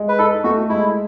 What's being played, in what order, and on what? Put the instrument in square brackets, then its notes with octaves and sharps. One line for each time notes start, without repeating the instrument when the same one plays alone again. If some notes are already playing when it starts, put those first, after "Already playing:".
Already playing: [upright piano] G#3
[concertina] B4
[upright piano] D#4 [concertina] A4
[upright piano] A3 [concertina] F#4
[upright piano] G#3 [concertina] E4